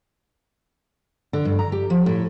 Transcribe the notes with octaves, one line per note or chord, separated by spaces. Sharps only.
D3
G2
A#5
G4
F3
A2